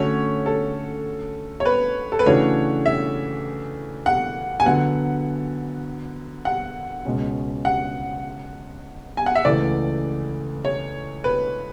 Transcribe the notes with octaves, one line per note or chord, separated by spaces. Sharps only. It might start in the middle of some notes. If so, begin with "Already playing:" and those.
Already playing: D3 A3 C#4 F#4 C#5
A4
C#5
B4
A4
B4
C#3 E3 A3 D4 F#4 C#5
E5
F#5
G#5
D3 F#3 B3 F#5
F#5
C#2 B2 G#3 C#4
F#5
G#5
F#5
E5
C#2 C#3 E3 A3 D5
C#5
B4